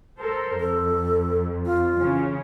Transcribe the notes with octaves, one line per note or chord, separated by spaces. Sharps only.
A4 A#4 C5
F2 A4
F4
C#3 E3 C#4